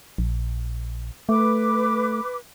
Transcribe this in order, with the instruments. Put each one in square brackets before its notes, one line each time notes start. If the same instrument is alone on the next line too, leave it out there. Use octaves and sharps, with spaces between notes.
[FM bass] A#1
[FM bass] A3 [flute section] B4 D6